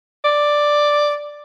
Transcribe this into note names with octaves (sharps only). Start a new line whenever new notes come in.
D5